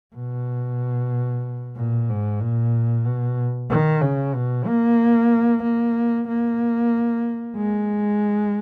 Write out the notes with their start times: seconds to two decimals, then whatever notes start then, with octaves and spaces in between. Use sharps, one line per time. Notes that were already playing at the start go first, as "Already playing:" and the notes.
0.15 B2
1.76 A#2
2.09 G#2
2.40 A#2
3.05 B2
3.70 D#3
4.02 C#3
4.34 B2
4.67 A#3
5.63 A#3
6.28 A#3
7.57 G#3